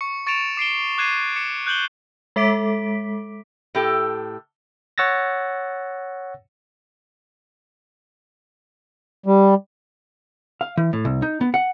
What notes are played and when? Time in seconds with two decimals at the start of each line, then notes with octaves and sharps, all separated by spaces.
0.01 C#6 C#7
0.27 C#6 A6 C#7 D7 E7 F7
0.57 D6 C7 D7 G7
0.98 D6 F#6 G#6 C7 D#7
1.36 D6 C#7
1.67 F#6 G6 F#7 G7
2.36 G#3 A4 E5 D6 B6 D7
3.75 A2 G4 A4
4.98 C#5 F#5 E6 A6 A#6
9.26 G3
10.61 F5
10.77 E3
10.93 A2
11.05 C2
11.22 D#4
11.41 B3
11.54 F#5